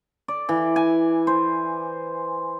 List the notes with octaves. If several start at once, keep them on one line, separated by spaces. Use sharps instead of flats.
D5
E3
G#5
C5